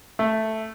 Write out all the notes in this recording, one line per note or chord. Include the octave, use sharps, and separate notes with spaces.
A3